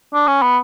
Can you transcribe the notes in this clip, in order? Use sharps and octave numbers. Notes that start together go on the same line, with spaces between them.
D4
C#4
B3